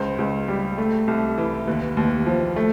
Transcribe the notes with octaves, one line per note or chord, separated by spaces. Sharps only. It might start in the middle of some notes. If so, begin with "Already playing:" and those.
Already playing: C#2 C5
C#2
G3
A3
C2
E3
D#2 B4
D#2
F3
A3